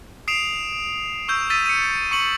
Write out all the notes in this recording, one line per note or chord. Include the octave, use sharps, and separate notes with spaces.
D#6 C7 D7 E7 F7
C#6 E6 G6
E6 A6 B6 D#7
C#7 D#7
C#6 C#7 F#7